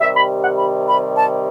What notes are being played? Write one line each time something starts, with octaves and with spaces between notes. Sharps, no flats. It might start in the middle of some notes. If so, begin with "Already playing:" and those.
C3 D#3 G3 E5
B5
F#5
B5
B5
A5